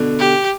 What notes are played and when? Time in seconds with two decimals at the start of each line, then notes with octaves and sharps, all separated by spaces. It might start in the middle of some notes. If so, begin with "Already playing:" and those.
Already playing: B2 D3
0.19 G4